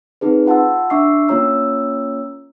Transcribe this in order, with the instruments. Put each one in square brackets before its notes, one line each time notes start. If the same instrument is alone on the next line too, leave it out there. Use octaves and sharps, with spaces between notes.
[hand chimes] C4 D#4 G#4 B4
F4 F#5 A5 C6 E6
D4 E5 C#6 D6 E6 C7
A#3 C#4 F4 C#5 A#5 E6